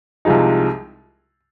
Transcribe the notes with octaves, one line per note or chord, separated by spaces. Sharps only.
C2 C3 F3 G#3 D#4